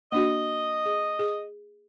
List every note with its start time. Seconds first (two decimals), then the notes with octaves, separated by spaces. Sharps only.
0.12 A#3 D4 F#4 D#5
0.86 G#4
1.19 G#4